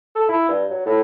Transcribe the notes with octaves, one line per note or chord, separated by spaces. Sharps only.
A4
E4
G2
F#3
A2